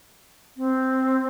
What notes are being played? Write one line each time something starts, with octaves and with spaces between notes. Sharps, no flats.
C4